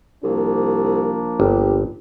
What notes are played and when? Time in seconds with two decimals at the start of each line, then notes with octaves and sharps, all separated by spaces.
0.24 C2 F3 A#3 D4
1.40 G1 G4